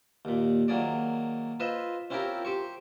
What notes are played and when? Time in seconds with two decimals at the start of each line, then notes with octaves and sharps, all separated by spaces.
0.25 D#2 A#2
0.68 D#3 F#3 A#3 G#4 D5
1.60 F4 B4 C5 D#5 E5
2.10 C4 C#4 E4 F4 G4 A#4
2.45 G4 C5 C#6